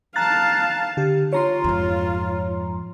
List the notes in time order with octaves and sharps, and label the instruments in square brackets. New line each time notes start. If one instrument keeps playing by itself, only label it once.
[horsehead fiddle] F5 A5 [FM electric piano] A#5 F#6 A6
[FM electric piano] D3 G4
[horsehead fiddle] F4 [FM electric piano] C#5 A#5 C6
[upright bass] F2 G#2